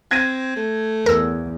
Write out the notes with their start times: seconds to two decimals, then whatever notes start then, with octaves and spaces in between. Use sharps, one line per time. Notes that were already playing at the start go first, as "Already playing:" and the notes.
0.11 C4 G#6 A#6 D#7
0.56 A3
1.06 E2 A#4 E6